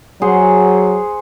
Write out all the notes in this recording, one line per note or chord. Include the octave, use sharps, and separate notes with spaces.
F#3 G#4 C5 F#5